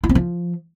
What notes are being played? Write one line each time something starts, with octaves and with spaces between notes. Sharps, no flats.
E4
C4
F3